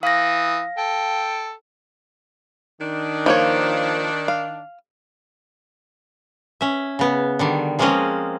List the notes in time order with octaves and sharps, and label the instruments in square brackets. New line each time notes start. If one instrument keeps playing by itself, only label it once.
[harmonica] E3 D#6 [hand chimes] F5 A#6
[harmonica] A4 G5
[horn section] D#3 D4
[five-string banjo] F3 A#3 C#5
F5
[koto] C#4 E5
C#3 B3
D3 D#3 G3
F3 G#3 A#3 C4 C#4 D#5